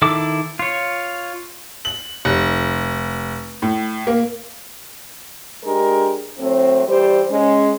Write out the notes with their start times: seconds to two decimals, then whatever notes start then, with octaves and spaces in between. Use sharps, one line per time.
0.02 D#3 E4 A4 D6
0.59 F4 C#5
1.85 F#7
2.25 F1
3.62 A2
4.07 A#3
5.64 G#3 D4 G4 G#4 A#4
6.38 A2 F#3 A3 C4
6.87 E3 G3 G4 C5 D5
7.31 G#3 C#4